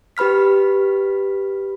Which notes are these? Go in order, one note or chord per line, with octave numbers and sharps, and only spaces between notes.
G4 B4 B5 F6 B6